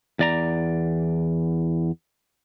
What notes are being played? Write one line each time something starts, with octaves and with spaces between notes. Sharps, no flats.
E2 D5 A#5